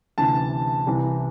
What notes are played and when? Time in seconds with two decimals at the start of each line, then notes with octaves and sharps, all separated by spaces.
0.18 D2 C3 E3 A5
0.87 C2 C3 E3